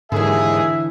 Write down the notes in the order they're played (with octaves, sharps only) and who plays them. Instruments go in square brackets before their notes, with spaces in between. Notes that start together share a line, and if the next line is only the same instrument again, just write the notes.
[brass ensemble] D#2 G#4 [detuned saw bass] G#2 [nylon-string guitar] D3 E3 [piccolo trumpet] E5